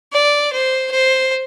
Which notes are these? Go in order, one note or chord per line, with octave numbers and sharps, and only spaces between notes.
D5
C5
C5